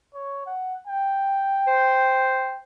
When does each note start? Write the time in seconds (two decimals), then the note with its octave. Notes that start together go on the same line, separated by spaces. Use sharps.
0.14 C#5
0.46 F#5
0.87 G5
1.67 C5